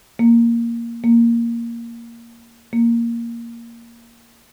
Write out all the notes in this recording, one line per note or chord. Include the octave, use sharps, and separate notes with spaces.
A#3
A#3
A#3